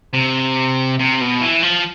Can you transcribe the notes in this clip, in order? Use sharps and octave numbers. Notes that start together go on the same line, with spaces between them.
C3
C3
B2
E3
F3